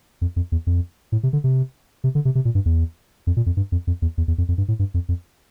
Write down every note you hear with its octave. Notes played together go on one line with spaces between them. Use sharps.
F2
F2
E2
F2
A2
C3
D3
C3
C3
D3
C3
C3
A#2
G2
E2
F2
A#2
F2
G2
F2
F2
E2
E2
E2
F2
F2
G2
A2
G2
F2
F2